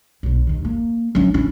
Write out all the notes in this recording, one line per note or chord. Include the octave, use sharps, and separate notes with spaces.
B1 B2
D#2 D#3
A#3
F#3 C#4
C#4 E4